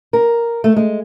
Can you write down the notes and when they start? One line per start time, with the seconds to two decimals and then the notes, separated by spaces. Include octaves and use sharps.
0.13 A#4
0.64 A3
0.76 G#3